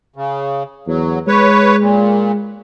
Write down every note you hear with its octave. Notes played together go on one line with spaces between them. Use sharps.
C#3
E2 F#3
G#3 B4 C#5
A#2